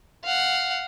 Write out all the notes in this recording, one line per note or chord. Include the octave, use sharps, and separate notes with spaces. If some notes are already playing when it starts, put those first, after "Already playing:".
F5 F#5